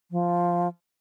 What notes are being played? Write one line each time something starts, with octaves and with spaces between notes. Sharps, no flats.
F3